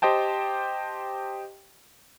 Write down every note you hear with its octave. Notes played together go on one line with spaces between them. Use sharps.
G4 C5 D#5 G5 A5